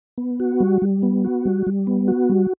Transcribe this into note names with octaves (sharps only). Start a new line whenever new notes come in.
B3
F#4
G3
G3
B3
F#4
G3
G3
B3
F#4
G3